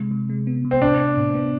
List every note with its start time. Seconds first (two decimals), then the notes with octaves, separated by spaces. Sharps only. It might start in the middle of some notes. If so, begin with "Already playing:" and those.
Already playing: C3 G#3
0.11 C3
0.30 G#3
0.47 B3
0.64 C3
0.71 C4
0.81 A2 D4
0.99 B3
1.17 A2
1.34 B3